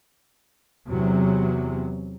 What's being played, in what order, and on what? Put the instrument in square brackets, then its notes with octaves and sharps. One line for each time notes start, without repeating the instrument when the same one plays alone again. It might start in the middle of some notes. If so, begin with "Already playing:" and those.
[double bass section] E2 C3 F#3